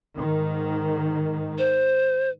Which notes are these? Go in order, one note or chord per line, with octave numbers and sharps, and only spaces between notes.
G#2 D#3
C5